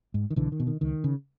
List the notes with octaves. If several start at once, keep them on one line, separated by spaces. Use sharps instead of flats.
G#2
D#3
B1 D3 E3
D#3
B2
D#3
C#2 D#3
C#3